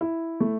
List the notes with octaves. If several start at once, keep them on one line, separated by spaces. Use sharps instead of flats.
E4
A3